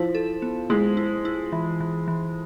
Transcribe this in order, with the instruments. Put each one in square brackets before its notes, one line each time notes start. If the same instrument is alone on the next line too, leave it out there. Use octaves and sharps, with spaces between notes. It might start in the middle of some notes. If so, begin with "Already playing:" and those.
Already playing: [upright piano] F3 [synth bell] E4
[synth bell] A4
B3
[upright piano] G#3 [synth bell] E4
[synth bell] E4
E4
E3
E3
E3